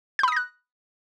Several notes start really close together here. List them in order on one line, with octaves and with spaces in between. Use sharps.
G6 B5 D#6 A#6 F#6